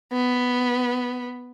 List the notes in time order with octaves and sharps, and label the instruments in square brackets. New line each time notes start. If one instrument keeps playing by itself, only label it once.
[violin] B3